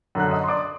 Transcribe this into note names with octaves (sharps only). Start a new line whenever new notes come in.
F#2 D3 F#6
D#5 D#6
C6
D5 D6